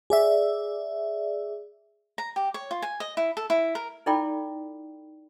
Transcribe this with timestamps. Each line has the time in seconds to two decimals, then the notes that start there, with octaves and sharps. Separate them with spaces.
0.10 G#4 D5 E5
2.18 A#5
2.36 G4
2.54 C#5
2.71 F4
2.82 G#5
3.00 D#5
3.17 E4
3.37 A4
3.50 E4
3.75 A#4
4.06 D#4 E4 A4 D5 G5 B5